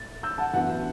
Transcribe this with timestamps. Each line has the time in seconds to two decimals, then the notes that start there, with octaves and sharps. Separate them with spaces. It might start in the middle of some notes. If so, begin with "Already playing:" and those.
Already playing: A2 A6
0.23 E6 G6
0.38 F#5 A5
0.53 A1 G2 F#3 B3 E4 F#5